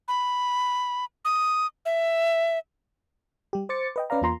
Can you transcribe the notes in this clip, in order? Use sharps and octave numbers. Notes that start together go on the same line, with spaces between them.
B5
D#6
E5
G3 G4
C5 D6 A6 C#7
B4 D#5 G5
C#4 B4 D5 F5 A#5
E2 A#3 F4 A#5 C6